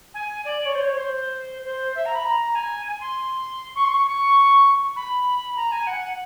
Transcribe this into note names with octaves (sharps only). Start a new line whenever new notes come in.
G#5
D5
C#5
C5
C#5
C5
C5
E5
A#5
B5
A#5
G#5
G#5
C6
C#6
C6
C#6
C#6
B5
A#5
G#5
F#5